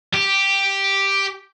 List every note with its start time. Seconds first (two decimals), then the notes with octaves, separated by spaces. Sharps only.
0.14 G4